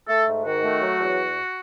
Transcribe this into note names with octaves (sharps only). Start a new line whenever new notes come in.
A3 A4
G#2
D#3 F#4
A3
F#3
E2